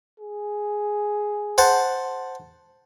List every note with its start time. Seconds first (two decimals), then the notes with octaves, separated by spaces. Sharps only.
0.20 G#4
1.58 C5 F#5 A5